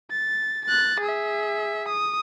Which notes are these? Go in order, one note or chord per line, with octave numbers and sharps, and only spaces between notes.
A6
F#6 A6
G#4 E5
D#6